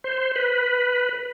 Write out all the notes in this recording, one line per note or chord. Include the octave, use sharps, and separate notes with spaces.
C5
B4